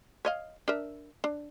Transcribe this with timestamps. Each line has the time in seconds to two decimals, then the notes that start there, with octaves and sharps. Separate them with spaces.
0.25 C#5 D#5 F5
0.68 D4 A#4 E5
1.24 D4